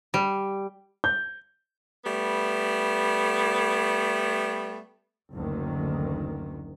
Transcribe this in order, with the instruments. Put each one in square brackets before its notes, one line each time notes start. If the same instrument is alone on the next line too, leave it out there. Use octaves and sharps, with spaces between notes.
[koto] G3
[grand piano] G6
[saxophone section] G3 A3 B3
[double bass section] F#1 D2 D#3